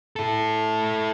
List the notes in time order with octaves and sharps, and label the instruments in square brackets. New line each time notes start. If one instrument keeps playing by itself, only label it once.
[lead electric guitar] E4 A4